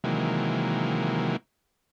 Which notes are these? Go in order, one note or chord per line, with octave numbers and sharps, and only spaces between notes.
C3 D#3 E3 F#3 G#3 A#3